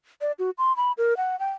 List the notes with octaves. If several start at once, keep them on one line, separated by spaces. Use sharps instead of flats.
D5
F#4
C6
B5
A#4
F#5
G5